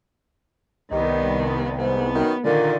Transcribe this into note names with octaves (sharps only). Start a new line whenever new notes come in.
C2 D#3 G3 B3 D#4
G#2 B3
F#2 B2 D#3
A#2 D3 D#3